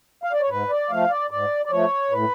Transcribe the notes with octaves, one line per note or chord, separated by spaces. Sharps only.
F5
D5
C#5
G#2 B4
D5
F3 A3 F5
D5
G#2 D5
D5
F3 A3 C#5
A2 B4